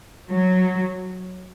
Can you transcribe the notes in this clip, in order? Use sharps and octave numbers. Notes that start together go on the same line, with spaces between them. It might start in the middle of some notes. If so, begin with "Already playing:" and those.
F#3